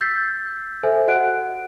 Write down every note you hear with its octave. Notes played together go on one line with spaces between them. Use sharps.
E6 G6 A6 B6 C7
A4 C5 E5 G#5
F#4 D#5 F#5 F#6 D7